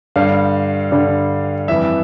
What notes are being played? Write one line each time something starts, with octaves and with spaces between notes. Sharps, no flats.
G2 D3 G3 F5
G2 D3 G3
F2 E3 G3 E5